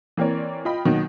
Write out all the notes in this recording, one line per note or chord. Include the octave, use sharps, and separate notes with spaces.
E3 A#3 C4 A#4 C#5 D5
F4 D#5 G5 B5
B2 D#3 F#3 A#3